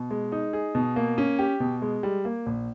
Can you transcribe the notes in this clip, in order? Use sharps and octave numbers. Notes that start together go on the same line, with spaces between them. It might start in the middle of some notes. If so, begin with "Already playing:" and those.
Already playing: B2
G#3
D#4
G#4
B2
A#3
C#4
G4
B2
G#3
G3
A#3
A#1